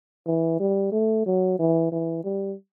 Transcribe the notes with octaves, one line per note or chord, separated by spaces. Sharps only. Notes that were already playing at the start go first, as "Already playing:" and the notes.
E3
G3
A3
F#3
E3
E3
G3